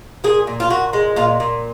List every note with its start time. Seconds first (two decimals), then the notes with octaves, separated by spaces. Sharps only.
0.24 A#2 G#4
0.47 A#2
0.60 F4
0.70 A#2 F#4
0.93 G#3
1.16 A#2 F4
1.40 A#2